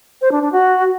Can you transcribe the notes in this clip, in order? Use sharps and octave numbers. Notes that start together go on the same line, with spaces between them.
C5
D4
D4
F#4